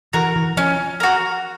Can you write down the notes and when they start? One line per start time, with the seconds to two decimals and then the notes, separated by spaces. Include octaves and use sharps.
0.13 E3 F#4 A#4
0.36 E3
0.57 F3 C#4
1.00 F#4 A#4